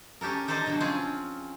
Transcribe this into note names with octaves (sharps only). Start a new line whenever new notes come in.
C#4 G4 A4 A#4
G4 A4 A#4 C5 D5 D#5
B2 D3 F3 F#3
C4 C#4 F4 G#4